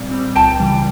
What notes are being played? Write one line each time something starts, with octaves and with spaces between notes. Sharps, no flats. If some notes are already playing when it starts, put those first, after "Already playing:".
Already playing: A#2 G3 C4
G3 C4
C#2 G5 A5
C#3 E3 G3